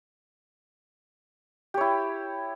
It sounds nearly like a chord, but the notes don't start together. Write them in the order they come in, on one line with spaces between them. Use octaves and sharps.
G4 C#5 E4